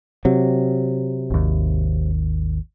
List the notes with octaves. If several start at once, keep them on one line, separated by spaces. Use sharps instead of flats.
C3 F#3
G#1 D#2